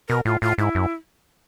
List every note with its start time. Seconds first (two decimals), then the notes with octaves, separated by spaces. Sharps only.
0.09 B2 A#4
0.25 A2 F4
0.42 A2 F4
0.58 G#2 E4
0.75 F#2